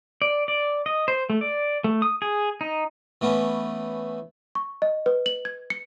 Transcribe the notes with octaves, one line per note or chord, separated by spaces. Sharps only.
D5
D5
D#5
C5
A3
D5
A3
D#6
G#4
D#4
E3 A3 B3 C#4
C#6
D#5
B4
F#7
G#6
C#7